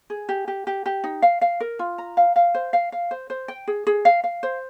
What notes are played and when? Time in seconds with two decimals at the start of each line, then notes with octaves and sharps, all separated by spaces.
0.10 G#4
0.29 G4
0.48 G4
0.67 G4
0.86 G4
1.04 D#4
1.22 F5
1.41 F5
1.60 A#4
1.79 F4
1.98 A#5
2.17 F5
2.36 F5
2.55 C5
2.73 F5
2.92 F5
3.11 C5
3.30 C5
3.48 G5
3.68 G#4
3.87 G#4
4.05 F5
4.24 F5
4.43 C5